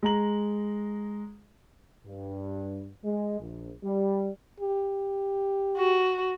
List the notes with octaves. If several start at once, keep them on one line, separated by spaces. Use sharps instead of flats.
G#3 A#5 F#7
G2
G#3
A#1
G3
G4
F#4